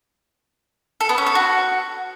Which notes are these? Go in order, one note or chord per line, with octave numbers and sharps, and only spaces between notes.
A4
B3
C#4
A4
F#4